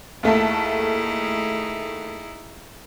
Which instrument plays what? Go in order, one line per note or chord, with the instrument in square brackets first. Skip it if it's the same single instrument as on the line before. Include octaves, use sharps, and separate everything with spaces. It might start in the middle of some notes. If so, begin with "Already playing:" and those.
[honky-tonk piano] D#2 A3 A5 [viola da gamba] D#4 E4 G#4